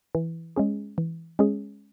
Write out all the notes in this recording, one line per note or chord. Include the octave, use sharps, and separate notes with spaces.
E3
G#3 C#4 G#4
E3
G#3 C#4 G#4